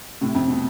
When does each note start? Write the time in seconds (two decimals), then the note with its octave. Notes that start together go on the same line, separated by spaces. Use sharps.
0.21 A2 C3
0.35 F2 A2
0.48 B2